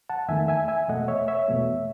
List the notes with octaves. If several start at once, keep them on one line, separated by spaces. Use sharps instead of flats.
F#5 A5
E2 D#3 A3 E5 G#5
E5 G#5
E5 G#5
E2 B2 A3 D#5 F#5
C#5 E5
C#5 E5
E2 B2 A3